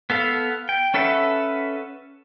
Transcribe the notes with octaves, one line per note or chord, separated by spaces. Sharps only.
B3 A4 F5
G5
C#4 A4 B4 E5 F#5